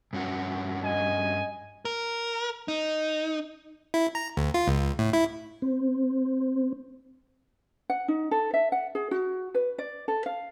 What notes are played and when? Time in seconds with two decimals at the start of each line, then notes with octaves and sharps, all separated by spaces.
0.13 G2 C#4 F#4
0.84 D#5 G#5
1.85 A#4
2.68 D#4
3.94 E4
4.15 A#5
4.37 D2
4.54 F4
4.68 C#2
4.99 A2
5.13 E4
5.62 C4
7.90 F#5
8.08 D#4
8.31 A4
8.54 E5
8.72 F#5
8.95 G#4
9.11 F#4
9.55 B4
9.78 D5
10.08 A4
10.26 F5